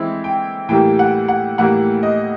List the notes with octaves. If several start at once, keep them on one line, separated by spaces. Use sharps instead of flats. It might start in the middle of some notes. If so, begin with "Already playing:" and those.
Already playing: E3 G#3 C4 E4
G5
A2 E3 G3 A#3 G5
F#5
F#5
A2 E3 G3 A#3 F#5
D#5